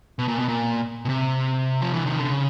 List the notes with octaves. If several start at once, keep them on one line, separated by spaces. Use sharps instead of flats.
B2
A#2
B2
A#2
B2
C3
F3
E3
D#3
D3
C#3